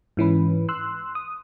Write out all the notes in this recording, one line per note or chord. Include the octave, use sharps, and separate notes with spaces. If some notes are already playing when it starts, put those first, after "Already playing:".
G#2 E3 C#4 B4
C6 E6 F#6
D#6